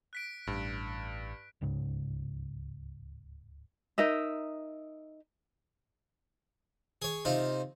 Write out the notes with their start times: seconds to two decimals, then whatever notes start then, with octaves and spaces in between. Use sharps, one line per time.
0.13 F#6 B6 D7
0.47 A1 G2
1.61 D1 C#2 G#2 C#3
3.98 D#4 A#4 D#5 E5
7.02 G#4 C#5
7.25 C3 D#4 F4